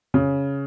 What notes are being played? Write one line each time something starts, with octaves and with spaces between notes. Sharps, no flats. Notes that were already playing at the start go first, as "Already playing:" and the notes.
C#3